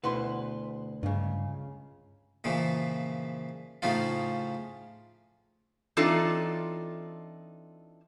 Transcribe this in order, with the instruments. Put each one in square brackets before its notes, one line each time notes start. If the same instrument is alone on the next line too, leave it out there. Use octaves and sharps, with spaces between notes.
[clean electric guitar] D2 [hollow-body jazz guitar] B2 E4 B4 [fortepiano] F#5 C6
[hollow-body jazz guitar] C#2 C#3 [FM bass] G2
[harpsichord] A#2 C#3 E3 F3
A2 C#3 F3 C#4 D#4 F4
[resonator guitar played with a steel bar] E3 C4 D4 D#4 F4 A4